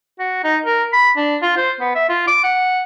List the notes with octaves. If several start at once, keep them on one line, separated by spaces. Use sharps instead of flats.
F#4
D#4
A#4
B5
D4
F4
C5
B3
E5
F4
D6
F#5